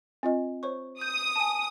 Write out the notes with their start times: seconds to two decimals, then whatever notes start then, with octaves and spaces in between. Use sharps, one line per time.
0.23 C4 F4 D#5
0.63 C5 C#5 C#6
1.01 D#6 G6
1.36 G#5 A5